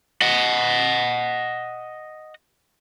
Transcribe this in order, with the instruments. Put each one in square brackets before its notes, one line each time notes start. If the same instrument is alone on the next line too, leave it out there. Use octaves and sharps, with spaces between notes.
[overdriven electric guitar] D#5 F#5